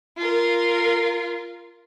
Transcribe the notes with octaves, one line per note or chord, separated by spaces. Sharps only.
F4 A#4